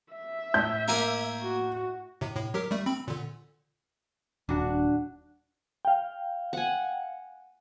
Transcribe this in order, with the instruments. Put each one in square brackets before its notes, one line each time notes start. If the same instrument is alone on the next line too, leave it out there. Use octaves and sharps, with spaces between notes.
[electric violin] E5
[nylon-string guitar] A2 [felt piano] G6
[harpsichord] A#3 A#4 G#5
[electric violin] F#4
[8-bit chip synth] A2 C3
A2
F#3 G4 A#4
G3 A3
C4 B5
A#2 D3
[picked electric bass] D#1 [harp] D4 F#4
[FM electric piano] F5 G5
[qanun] F#5 G#5